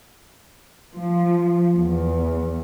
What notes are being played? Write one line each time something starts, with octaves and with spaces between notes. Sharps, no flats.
F3
E2